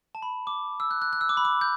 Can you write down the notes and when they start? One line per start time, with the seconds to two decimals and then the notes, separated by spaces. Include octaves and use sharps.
0.15 A5
0.22 B5
0.47 D6
0.80 E6
0.91 F#6
1.02 F#6
1.13 F#6
1.21 E6
1.29 D6
1.37 B5
1.45 D6
1.61 G6